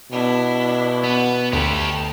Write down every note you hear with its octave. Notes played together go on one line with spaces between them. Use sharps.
B2 D4 E4
B3
D2 G4 C#5 A5